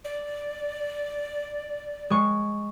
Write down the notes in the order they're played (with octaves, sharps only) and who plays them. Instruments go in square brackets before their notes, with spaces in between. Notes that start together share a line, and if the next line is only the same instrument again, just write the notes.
[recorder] D5
[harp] G#3 C#6